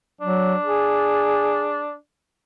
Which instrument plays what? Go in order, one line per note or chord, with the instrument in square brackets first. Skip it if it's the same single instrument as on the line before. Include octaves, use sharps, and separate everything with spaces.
[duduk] F#3 [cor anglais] D4
[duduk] G#4